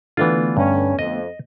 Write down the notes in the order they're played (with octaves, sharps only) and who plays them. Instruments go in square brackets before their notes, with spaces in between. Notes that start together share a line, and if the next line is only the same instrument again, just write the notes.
[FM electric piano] D3 A3 B3 [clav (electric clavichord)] E3 D4 F4
[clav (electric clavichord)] G2 [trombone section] C#4
[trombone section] F2 [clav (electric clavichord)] D#5